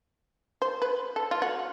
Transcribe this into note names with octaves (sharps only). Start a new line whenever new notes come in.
C5
B4
A4
F4
F#4